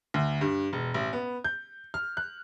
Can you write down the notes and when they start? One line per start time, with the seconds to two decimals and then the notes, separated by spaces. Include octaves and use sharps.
0.14 D2
0.41 G2
0.73 E1
0.94 A1
1.13 B3
1.44 G6
1.94 F6
2.17 F#6